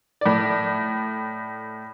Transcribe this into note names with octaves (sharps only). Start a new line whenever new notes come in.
A2 D5